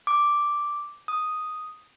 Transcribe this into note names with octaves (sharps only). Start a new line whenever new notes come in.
D6
D#6